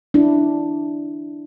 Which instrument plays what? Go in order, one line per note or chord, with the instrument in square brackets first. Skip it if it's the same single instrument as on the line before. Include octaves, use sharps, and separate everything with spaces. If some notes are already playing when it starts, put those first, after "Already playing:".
[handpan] D4 E4